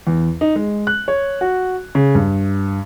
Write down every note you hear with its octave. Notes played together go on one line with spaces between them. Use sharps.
E2
D#4
G#3
F#6
C#5
F#4
C#3
G2